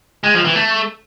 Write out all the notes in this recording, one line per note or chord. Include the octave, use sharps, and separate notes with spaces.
G#3
F3
E3
A3